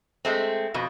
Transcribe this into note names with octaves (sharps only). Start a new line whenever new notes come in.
G#3 A3 C4
F2 B2